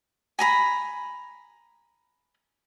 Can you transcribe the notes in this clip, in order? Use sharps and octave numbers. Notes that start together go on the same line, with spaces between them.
G#5 A#5 B5